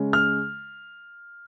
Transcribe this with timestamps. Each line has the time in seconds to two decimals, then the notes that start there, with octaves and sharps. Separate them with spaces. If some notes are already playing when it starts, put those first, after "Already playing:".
Already playing: C#3 G#3 C#4
0.13 F6